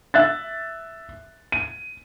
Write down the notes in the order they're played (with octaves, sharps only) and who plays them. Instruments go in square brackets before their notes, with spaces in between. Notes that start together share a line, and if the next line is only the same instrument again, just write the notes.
[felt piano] E5 F#6 A6
D#7